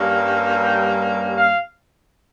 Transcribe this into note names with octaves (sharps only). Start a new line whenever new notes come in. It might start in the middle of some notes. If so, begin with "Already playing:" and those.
Already playing: G2 G3 A#3 C#4
G5
F5